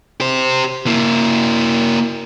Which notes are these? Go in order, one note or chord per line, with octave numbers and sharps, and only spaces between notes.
G4 C5
A#3 E4